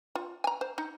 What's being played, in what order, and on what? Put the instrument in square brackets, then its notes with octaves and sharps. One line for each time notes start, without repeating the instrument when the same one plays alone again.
[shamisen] F4
G#5 A#5
C5
D#4